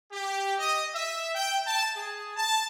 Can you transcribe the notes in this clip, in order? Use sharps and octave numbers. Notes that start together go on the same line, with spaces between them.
G4
D#5
E5
G5
A5
G#4
A5